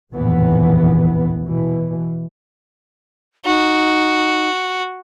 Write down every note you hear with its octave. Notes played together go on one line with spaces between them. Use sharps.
F1 A#1 D#2 A2 E3 B3
B2 E3
D#4 F#4